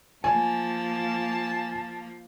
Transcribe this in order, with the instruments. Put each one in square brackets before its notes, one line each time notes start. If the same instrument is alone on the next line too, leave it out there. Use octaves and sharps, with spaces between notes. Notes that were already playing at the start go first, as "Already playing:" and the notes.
[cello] F3 A#3 [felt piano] G#5 [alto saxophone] A5